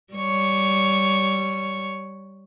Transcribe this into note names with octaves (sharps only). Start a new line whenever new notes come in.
G3 C#5